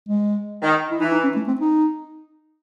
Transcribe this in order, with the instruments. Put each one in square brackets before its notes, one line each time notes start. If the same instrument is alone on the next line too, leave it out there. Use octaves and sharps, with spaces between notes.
[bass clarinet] G#3
[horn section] D#3
[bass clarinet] E4
[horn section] E3 [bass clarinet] D#4
[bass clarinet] D#4
C#4
A3
C4
D#4